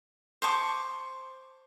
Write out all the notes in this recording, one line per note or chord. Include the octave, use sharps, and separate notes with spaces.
C5 A5 C#6 D6